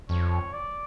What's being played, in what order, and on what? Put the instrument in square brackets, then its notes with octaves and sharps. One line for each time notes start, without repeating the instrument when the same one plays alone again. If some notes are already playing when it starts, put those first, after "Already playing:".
[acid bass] F2 [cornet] C#5
[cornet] D5